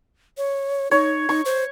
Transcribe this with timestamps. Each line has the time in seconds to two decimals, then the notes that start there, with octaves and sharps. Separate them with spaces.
0.38 C#5
0.91 D#4 C#5
1.29 D#4 C#6
1.45 C5